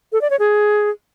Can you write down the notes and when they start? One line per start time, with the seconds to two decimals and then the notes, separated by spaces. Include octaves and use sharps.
0.12 A4
0.21 D5
0.30 C#5
0.39 G#4